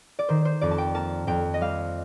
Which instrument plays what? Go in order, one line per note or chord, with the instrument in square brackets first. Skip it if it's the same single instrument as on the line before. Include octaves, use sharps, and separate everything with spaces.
[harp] D5
D#3 C5
C5
F2 D5
A5
G5
A#3 A5
F2 G5
D#5
G3 F5